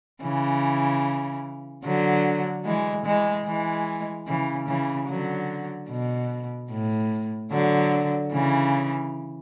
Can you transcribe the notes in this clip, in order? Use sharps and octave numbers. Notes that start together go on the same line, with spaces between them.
C#3 E3
D3 F#3
E3 G#3
E3 G#3
E3 G#3
C#3 E3
C#3 E3
D3 F#3
B2
A2
D3 F#3
C#3 E3